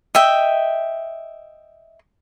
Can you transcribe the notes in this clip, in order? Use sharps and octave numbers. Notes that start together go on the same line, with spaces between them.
D#5 E5 G5